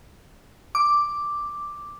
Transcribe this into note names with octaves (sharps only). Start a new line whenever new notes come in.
D6